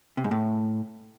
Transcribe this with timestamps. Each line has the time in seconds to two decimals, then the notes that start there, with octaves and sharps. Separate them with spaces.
0.17 C3
0.24 G#2
0.31 A2